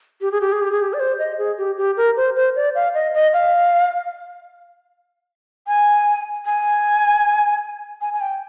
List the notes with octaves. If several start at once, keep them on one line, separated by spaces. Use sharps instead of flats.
G4
G#4
G4
G#4
G4
G#4
G4
D5
C5
D#5
G#4
G4
G4
A#4
C5
C5
D5
F5
D#5
D#5
F5
G#5
G#5
G#5
G#5
G5